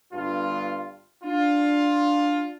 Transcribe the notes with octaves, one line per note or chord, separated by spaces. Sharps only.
G1 G2 F4
D4 F4